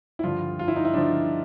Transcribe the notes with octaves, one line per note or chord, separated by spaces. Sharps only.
E4
G2 D3 F3 F4
F4
E4
D#4
E4
G2 D3 F3 D4